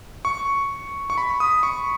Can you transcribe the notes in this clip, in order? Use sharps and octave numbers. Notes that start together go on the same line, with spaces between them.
C#6
C#6
B5
D#6
C#6